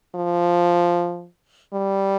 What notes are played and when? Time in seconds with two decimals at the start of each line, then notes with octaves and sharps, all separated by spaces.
0.15 F3
1.74 G3